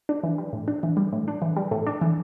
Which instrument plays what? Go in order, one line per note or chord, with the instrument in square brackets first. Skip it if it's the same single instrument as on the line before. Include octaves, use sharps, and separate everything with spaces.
[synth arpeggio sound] D4
E3
G3
A2
D4
E3
G3
A2
D4
E3
G3
A2
D4
E3